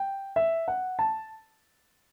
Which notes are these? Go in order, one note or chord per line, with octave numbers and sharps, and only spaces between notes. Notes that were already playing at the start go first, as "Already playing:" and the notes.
Already playing: G5
E5
F#5
A5